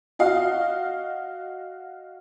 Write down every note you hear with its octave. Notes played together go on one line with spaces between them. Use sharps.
F#4 D#5 F5